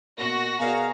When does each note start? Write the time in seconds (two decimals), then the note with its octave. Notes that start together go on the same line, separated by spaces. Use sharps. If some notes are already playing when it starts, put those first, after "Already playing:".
0.18 B2 A#3 F#4 A#6
0.60 B2 B3 G#4 A#4 D5 F5 A#5